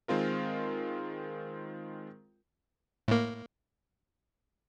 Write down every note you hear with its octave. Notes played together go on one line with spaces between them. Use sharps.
D#3 G#3 C4 F4 A#4
A2 A#3